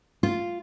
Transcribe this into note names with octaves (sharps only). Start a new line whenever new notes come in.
F4